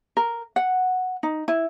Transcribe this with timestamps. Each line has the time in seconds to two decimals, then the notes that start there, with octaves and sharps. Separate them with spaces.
0.17 A#4
0.56 F#5
1.23 D#4
1.48 E4